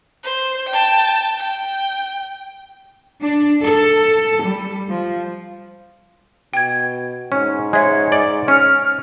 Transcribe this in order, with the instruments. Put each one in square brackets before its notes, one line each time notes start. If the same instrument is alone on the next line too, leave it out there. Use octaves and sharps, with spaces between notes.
[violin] C5
G5 A5
G5
[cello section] D4
A4
G3
F3
[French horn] B2 [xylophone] G5 G#6
[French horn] G#2 [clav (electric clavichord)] C#4
[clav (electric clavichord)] G#3 [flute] C#5 [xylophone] E5 G#6
[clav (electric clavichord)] D5
[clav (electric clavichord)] C#4 [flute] F6 [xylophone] C#7